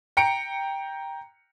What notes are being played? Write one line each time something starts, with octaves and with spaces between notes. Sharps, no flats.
G5 A#5 C#7 D7